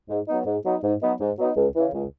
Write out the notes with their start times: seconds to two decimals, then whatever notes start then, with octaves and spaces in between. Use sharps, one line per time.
0.09 G#2
0.28 F#3 B3 D#4
0.46 G#2
0.64 F#3 B3 D#4
0.84 G#2
1.01 F#3 B3 D#4
1.20 G#2
1.38 F#3 B3 D#4
1.56 C#2
1.74 C#3 E3
1.93 C#2